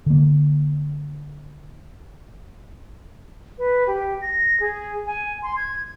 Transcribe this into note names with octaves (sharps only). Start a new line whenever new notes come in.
D3 A#3
B4
G4
A#6
G#4
G#5
C6
G#6